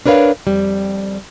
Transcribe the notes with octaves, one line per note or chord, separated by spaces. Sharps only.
D4 A#4 B4 C#5 F5
F2 G3